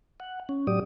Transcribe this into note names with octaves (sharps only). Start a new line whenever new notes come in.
F#5
C#4
A2 F#3 G4 D5 D#6